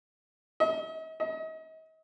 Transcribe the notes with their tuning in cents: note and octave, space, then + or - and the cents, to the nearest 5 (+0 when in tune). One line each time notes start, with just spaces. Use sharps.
D#5 +45
D#5 +40